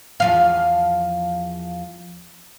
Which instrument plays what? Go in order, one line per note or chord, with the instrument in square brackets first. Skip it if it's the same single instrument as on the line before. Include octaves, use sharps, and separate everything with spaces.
[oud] E2 F3 F5